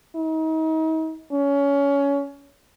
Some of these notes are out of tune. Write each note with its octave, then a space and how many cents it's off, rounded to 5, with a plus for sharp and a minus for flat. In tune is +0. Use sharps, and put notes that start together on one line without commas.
D#4 +40
C#4 +20